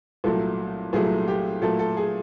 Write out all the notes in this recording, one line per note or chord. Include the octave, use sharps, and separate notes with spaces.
C2 A#2 F#3 A3 A4
C2 A#2 F#3 A3 G#4
G4
A#2 F#3 A3 A4
A4
G#4